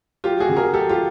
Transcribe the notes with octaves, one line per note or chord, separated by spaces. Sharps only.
F#3 F4 G4
F#4 G#4
C#3
G#4 A#4
F#3 G4 A4
F4 G4